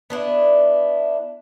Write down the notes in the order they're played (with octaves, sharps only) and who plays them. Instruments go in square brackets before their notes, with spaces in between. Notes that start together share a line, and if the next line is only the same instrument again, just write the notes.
[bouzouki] B3 D4 E4